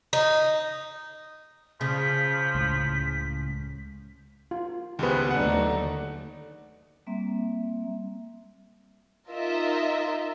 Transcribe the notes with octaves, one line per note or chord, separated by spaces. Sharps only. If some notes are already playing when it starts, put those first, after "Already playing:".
D#4
C#3 F3 B6
C#2 A2
F4
C#2 D#3 B3 G4 G#4 B4 C5
D#2 D3 F#3 A3 D4 D#4 F#5
G3 A#3 C4 E5
D#4 F4 A#4 D#5 E5